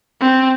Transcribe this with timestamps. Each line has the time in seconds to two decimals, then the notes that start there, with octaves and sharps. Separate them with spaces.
0.21 C4